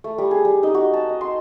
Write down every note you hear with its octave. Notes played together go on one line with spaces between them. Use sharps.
A3
G3
G#4
G3
D#4
F#4
A5
D#5
C6